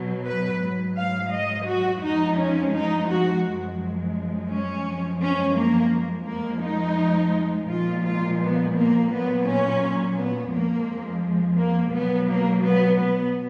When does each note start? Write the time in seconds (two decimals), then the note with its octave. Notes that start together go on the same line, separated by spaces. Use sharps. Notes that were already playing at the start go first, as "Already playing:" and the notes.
Already playing: B2 F#3
0.25 B4
0.60 G#2 F#3
0.96 F5
1.32 D#5
1.66 F#4
2.02 F2 F3 G#3 D#4
2.37 C#4
2.73 D#4
3.09 F#4
3.43 F#2 F3 G#3
4.50 C#4
4.85 F#2 F3 G#3
5.21 C#4
5.57 A#3
6.27 F2 F3 G#3 A#3
6.63 D#4
7.69 A#2 F3 G#3 F4
8.04 F4
8.40 B3
8.75 A#3
9.11 A#2 F#3 B3
9.46 C#4
10.17 B3
10.52 F2 F3 G#3 A#3
11.58 A#3
11.94 B2 F#3 B3
12.29 A#3
12.65 B3
13.00 B3